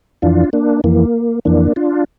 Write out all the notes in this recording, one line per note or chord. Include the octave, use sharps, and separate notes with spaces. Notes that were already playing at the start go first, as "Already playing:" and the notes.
F2 E3 D4 F4
A#3 D4
F2 E3 A#3
F2 E3 A#3 D4
D4 F4